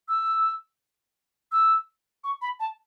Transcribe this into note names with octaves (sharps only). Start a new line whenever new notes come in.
E6
E6
C#6
B5
A5